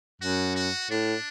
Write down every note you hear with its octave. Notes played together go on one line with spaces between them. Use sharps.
F#2 F#4
F#4
A2 D4